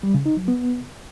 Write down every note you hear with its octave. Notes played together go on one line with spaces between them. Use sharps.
G3
C#3
D#4
F#3
B3